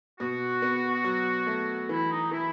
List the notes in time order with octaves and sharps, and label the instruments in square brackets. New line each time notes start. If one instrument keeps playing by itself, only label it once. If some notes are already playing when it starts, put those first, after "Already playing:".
[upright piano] B2 [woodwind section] F#4
[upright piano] B3
F#3
A3
[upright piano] E3 [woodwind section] E4
[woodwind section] D#4
[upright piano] E3 [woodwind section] E4